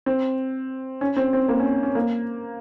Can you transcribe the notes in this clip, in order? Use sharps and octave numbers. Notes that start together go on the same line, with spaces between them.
C4
C#4
C4
C4
A#3
C#4
C#4
A#3